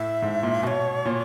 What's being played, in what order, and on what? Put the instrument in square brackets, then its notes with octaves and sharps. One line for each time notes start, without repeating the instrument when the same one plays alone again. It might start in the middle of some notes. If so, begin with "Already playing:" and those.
Already playing: [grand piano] A2 [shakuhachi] E5
[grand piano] G#2
A#2
[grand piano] B2 [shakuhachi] E5
[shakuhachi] C#5
[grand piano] A#2